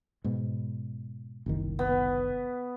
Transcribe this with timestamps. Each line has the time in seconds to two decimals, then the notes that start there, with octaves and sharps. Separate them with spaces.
0.24 G#2 B2
1.46 F#1 C2 D#3
1.79 B3